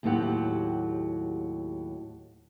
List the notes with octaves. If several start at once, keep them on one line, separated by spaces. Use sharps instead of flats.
D#2 A2 F#3 C4 G4 F#5